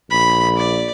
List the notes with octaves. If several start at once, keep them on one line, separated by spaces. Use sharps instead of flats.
A#1 B5
D5